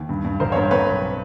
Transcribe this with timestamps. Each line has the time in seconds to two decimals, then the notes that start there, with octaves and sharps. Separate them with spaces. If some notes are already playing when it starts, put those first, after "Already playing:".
Already playing: D#2
0.09 G2
0.25 G2
0.40 A1 A#4 C5
0.52 C#5
0.56 G2 A#4 C5
0.71 C4 B4 C#5
0.87 B1